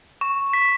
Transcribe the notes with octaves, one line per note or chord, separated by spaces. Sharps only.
C#6
B6